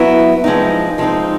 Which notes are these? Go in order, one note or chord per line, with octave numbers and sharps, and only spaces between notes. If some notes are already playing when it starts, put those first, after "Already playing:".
Already playing: F#3 B3 E4
F3 G#3 C4 D#4
F3 G#3 C4 D#4